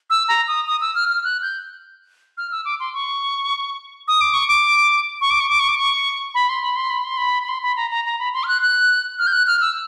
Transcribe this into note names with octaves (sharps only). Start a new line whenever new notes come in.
E6
A#5
D#6
D#6
E6
F6
F6
F#6
G6
F6
E6
D6
C6
C#6
D#6
D6
C#6
D6
C#6
D6
C#6
D6
C#6
D6
C#6
B5
C6
B5
C6
B5
C6
B5
B5
C6
B5
A#5
A#5
A#5
B5
C6
F6
F#6
F#6
F6
G6
F#6
F6
E6